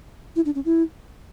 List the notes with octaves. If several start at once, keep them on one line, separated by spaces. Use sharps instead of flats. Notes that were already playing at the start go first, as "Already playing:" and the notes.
E4
D4
C#4
E4